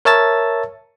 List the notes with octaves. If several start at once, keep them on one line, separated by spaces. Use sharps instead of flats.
A#4 C#5 E5 A5 E6 A6